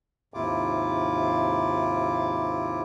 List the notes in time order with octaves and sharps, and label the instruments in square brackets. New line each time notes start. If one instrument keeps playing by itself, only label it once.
[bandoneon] D#2 G#2 C3 E4 F4 D6